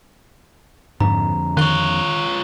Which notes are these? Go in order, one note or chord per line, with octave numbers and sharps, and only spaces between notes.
F2 G#2 D3 A#5
D#3 F4 C#5 F#6 G7